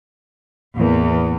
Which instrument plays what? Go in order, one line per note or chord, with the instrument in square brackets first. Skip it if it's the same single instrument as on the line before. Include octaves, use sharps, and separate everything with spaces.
[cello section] E2 [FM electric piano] A2 E3 A#3